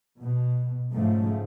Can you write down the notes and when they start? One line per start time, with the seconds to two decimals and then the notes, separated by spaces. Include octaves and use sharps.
0.20 B2
0.93 G#2 C#3 F3 A3